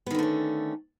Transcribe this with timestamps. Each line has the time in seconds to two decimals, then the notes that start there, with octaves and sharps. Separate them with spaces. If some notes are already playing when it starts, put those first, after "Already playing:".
0.06 B3
0.11 D#3
0.15 D3
0.19 A3
0.23 C#4